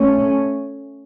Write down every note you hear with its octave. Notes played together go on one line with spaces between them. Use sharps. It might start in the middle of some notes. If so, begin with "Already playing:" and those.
Already playing: A3 C#4